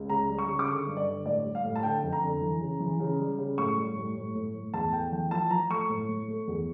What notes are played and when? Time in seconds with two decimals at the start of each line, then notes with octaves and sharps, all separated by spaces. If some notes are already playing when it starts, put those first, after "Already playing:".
Already playing: C#2
0.10 C#3 A#5
0.29 G3
0.39 C#6
0.48 C#3
0.59 D6
0.68 D3 C#6
0.87 G2
0.97 D5
1.06 D3
1.25 A2 D5
1.45 G3
1.55 F5
1.64 A2
1.76 A5
1.83 D3 G5
2.03 F2
2.13 A#5
2.23 D3
2.42 E3
2.61 C#3
2.80 E3
3.00 C#3
3.19 G3
3.39 C#3
3.58 A2 C#6
3.77 G3
3.96 A2
4.15 A2
4.35 A2
4.54 A2
4.74 E2 A5
4.93 A3 G5
5.12 E3 G5
5.31 F3 A5
5.51 F3 A#5
5.70 A3 C#6
5.89 A2
6.09 A2
6.28 A3
6.48 E2